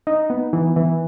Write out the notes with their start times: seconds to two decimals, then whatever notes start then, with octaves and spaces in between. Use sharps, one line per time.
0.07 D#4
0.30 B3
0.53 E3
0.76 E3